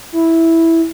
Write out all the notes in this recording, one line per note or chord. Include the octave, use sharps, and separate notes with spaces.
E4